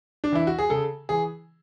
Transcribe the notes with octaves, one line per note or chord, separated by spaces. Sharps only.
D4
E3 E4
F#4
G#4
C#3 A4
E3 G#4